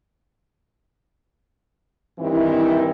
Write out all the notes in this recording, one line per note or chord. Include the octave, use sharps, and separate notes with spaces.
G2 D#3 E3 C4 E4